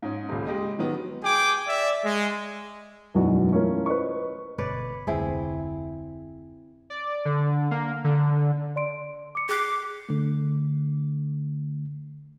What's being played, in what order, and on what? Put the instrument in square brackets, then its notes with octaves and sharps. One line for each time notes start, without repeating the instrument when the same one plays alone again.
[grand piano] G#2 C#4
D#1 C#2
G#3 G4 D#5
D#3 F#3 B3
[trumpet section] G#4 G5 G#5 D6
D5 E5
G#3
[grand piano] E1 B1 F#2 B2 E3 F#4
A3 C#4 E4 F4 A#4
B4 C5 D#5 C#6
[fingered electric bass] G1 B2 [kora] B4 C#5 D5
[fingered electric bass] F1 D2 [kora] C4 E4 G#4
[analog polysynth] D5
D3
A#3
D3
[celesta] D5 C6 D7
D6 C#7
[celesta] G#4 F#6 C7 [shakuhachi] D6
[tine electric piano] D3 A3